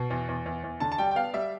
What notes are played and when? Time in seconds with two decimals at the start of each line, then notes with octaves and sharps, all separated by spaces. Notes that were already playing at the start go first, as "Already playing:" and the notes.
Already playing: B2
0.10 E2
0.29 E2
0.46 E2
0.64 E2
0.80 D3 A5
0.92 A5
0.98 G3 G5
1.11 G5
1.15 B3 F5
1.33 G3 E5